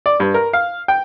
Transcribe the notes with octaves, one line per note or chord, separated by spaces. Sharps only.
D5
G2
A#4
F5
G5